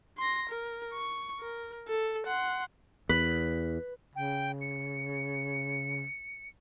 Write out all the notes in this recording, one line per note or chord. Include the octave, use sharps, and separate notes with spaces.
C6 A#6
A#4
C#6
A#4
A4
F#5 C6
E2 B4
C#3 G5
C#7